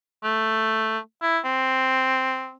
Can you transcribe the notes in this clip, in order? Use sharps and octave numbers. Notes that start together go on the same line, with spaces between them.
A3
E4
C4